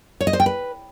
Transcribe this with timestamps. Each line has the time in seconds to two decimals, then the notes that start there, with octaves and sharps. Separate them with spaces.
0.21 C#5
0.27 D#5
0.33 C5
0.40 G5
0.46 B4